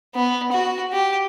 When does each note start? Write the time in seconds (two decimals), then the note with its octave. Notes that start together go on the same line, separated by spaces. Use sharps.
0.15 B3
0.52 F#4
0.92 G4